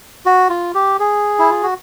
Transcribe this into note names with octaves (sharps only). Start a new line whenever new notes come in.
F#4
F4
G4
G#4
E4
F4
F#4